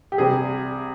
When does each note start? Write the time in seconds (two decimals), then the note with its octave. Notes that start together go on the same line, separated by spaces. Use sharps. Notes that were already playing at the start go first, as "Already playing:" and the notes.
0.12 G4
0.18 C2 C3 G3 G#4